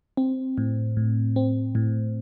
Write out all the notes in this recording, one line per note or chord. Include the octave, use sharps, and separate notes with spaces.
C4
A2
A2
C4
A2